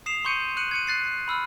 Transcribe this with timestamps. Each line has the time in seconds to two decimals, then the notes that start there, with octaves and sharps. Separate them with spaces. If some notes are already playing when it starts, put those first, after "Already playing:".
0.06 D#6 C7 E7 F7
0.25 C6 C#6 G6 C#7 D#7
0.57 F#6 C#7 D#7 F#7
0.71 G#6 C#7 D#7
0.87 F#6 A6 C7
1.28 B5 E6 F6